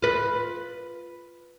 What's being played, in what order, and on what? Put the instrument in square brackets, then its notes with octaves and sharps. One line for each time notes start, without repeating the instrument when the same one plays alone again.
[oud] F4 B4